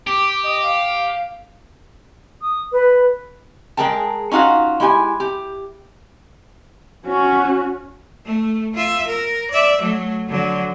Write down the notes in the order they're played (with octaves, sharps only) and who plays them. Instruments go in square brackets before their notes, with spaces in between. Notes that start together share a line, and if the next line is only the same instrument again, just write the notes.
[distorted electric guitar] G4 [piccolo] D6
[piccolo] D#5
F5
[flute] D#6
B4
[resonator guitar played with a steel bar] G#3 G#4 A#4 G5 A5
C#4 D#4 F4 F#4 F5
G#3 E4 G4 F#5 G#5
G4
[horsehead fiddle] C#4 F#4
[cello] A3
F4 E5
A#4
D5 E5
F#3 A3
D3 F#3